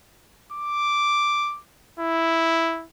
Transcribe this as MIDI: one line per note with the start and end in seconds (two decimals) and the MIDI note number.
0.52 1.60 86
2.00 2.85 64